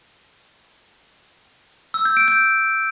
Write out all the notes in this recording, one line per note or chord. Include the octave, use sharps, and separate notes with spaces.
E6
G6
D7
G6